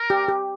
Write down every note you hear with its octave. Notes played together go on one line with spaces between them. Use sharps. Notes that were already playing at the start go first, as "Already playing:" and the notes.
Already playing: A#4
G4
G4